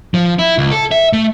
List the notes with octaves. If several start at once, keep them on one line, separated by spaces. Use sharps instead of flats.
F3
E4
C#2
A4
E5
A3